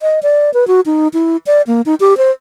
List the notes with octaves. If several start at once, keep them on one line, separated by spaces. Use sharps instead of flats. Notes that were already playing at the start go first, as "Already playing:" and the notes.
D#5
D5
B4
F#4
D#4
E4
D5
A#3
D#4
G4
C5